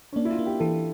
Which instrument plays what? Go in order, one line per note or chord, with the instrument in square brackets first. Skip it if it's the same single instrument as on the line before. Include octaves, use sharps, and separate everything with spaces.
[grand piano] C#4
[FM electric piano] A#3 [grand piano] D4
[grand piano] E4
F4
[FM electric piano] A#3
[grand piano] G4
[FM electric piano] E3 [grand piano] A4